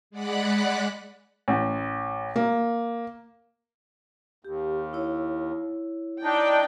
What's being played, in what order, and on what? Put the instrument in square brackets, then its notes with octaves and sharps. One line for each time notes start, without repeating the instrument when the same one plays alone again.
[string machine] G#3 D5 F#5 B5 F#6
[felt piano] A1
A#3
[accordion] D#2 [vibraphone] G4
[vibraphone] E4 C#5
[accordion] D4 D#4 [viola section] D5 G5